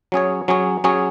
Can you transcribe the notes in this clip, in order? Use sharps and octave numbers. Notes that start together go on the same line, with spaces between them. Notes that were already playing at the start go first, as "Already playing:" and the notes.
F#3 C#4 G#4 C#5
F#3 C#4 G#4 C#5
F#3 C#4 G#4 C#5